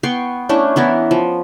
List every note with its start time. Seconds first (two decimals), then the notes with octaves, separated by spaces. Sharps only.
0.03 B3 G5 C6 C#6
0.49 A3 C#4 D4 E4
0.76 E3 B3 E4 A#4
1.11 F3